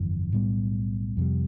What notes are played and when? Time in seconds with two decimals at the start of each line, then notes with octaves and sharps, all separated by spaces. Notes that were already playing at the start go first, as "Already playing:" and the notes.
Already playing: G1 F2 E3
0.32 B1 A2 G3 B3
1.17 F2 C3 G3